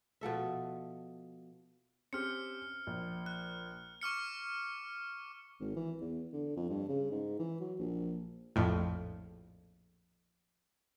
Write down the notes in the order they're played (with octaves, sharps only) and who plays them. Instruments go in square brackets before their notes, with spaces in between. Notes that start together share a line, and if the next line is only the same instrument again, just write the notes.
[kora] B2 F3 A4 E5
[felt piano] C4 C#4 G4 [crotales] F6 C#7
[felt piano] A#1
[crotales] F#6
C#6 D6 F6 C#7
[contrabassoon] G#1
E3
E2
D3
F2
G2
C#3
G#2
E3
F#3
A#1
[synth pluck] A#1 F2 A2